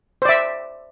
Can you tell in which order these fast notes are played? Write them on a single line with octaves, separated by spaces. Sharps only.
C5 D5 E5